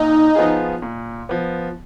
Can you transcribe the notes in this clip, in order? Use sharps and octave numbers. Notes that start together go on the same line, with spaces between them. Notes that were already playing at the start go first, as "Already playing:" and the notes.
Already playing: A#2 D#4
F3 B3 F4 G#4
A#2
F3 B3